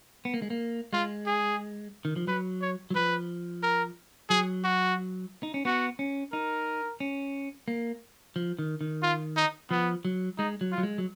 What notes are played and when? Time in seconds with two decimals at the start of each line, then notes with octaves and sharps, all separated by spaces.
0.25 B3
0.34 A#3
0.42 G#3
0.50 A#3
0.93 G#3 F4
1.26 G#4
2.05 D#3
2.16 F3
2.27 F#3 B4
2.61 C#5
2.90 F#3
2.95 F3 B4
3.63 A#4
4.30 F#3 G#4
4.64 F#4
5.43 D#4
5.54 C#4
5.65 B3 F#4
5.99 C#4
6.32 D#4 A#4
7.00 C#4
7.68 A#3
8.36 F3
8.59 D#3
8.81 D#3
9.03 F4
9.37 D#4
9.71 F3 B3
10.05 F#3
10.38 G#3 D#4
10.61 F#3
10.72 F4
10.78 F#3
10.83 G#3
10.98 F#3